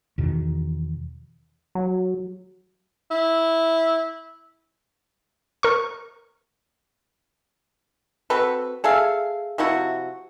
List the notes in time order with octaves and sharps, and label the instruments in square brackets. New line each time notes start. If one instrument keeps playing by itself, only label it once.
[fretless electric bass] E2 B2 D#3
[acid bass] F#3
[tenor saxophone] E4
[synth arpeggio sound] A#4 C#6
[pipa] C4 F#4 A4 B4
G#4 A4 E5 F5
C3 F3 E4 F#4